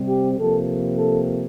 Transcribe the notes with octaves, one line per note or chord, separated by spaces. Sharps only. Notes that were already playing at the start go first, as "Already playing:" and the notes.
Already playing: C3 G3 C4
G4
C3 F3 A#3 A4
A4